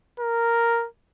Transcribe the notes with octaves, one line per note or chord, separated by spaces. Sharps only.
A#4